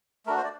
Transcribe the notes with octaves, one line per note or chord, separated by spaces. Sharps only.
A3 D4 F#4 A#4
C5
D5